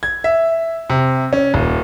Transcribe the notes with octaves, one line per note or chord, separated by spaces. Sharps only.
G#6
E5
C3
C#4
D#1